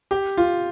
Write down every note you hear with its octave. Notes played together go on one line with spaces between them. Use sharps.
G4
F4